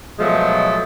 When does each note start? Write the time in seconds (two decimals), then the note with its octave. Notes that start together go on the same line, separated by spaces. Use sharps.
0.19 B2 F3 F#3 G#3 A3